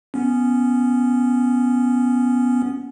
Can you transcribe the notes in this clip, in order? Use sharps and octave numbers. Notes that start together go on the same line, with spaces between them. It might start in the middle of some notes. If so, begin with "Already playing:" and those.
B3 C#4